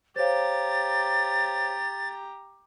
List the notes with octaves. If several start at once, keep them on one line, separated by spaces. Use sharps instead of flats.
G4 C5 C#5 F5 A#5 A6